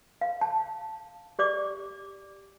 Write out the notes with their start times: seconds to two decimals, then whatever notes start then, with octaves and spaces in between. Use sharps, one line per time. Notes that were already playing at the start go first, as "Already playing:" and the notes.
0.21 F5
0.41 A5
1.39 G4 D5 D6